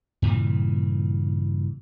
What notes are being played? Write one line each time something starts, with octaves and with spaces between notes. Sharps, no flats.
G2 A#2 C#3 E3